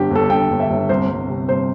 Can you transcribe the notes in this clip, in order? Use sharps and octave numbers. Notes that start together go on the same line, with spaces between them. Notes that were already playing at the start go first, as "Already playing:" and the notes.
Already playing: G1 D3 G4
G1 A4
G1 G5
G1
E5
G1
C2 C5
C2
C3
C2 C5